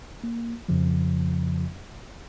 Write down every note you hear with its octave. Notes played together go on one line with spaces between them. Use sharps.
A#3
F2 C#3 F3